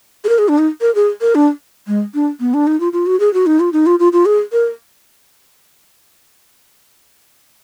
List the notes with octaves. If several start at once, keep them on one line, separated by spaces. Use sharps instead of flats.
G#4
A#4
G#4
D4
D#4
A#4
G#4
A#4
D4
G#3
D4
B3
D4
D#4
F4
F4
F#4
G#4
F#4
D#4
F4
D#4
F4
F4
F4
G#4
A#4